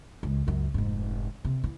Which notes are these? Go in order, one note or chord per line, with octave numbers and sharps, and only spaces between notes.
C#2 G#3
C#2 F#2
F1 G#2
C3
E3